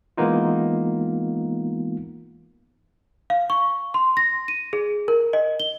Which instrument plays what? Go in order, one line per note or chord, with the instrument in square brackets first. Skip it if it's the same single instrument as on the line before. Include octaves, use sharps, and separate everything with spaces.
[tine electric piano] E3 G#3 A#3 B3 D#4 F4
[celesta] F5
C#6
C6
A#6
D#7
G#4
A#4
D#5
G7